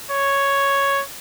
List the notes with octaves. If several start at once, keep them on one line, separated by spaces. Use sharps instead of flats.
C#5